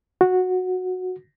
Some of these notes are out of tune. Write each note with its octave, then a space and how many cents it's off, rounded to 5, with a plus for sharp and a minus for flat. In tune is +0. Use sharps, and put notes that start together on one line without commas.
F#4 -10